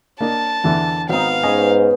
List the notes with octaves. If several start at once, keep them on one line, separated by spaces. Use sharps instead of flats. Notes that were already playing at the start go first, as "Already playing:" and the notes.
A#3 D4 D#5 A5
E2 D3 E3
G#1 B3 C4 D#4 F5
G#2 C#4 B4 D#5 G#5